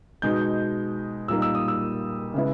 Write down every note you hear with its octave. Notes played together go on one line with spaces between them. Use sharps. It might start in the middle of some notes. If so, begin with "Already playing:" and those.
B2 G#3 D#4 G6
A#2 G3 A#3 D#4 E6
E6
D#6
E6
C#3 G#3 B3 E4